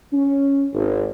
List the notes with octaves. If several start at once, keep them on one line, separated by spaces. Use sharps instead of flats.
C#4
G#1